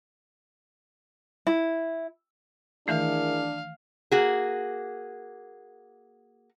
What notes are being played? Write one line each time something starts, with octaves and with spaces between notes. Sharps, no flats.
E4
D#3 E3 A3 D4 E4 G#4 A#4 F5
A#3 F#4 G#4